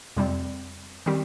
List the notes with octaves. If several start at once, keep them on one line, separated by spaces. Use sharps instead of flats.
F2 C3 G3 C4
D#3 G3 C4 G4